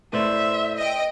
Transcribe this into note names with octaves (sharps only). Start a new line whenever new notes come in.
A2 B4 C5 D5 E5
D#5 G5